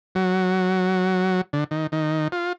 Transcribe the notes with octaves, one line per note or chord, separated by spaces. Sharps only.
F#3
D3
D#3
D#3
F4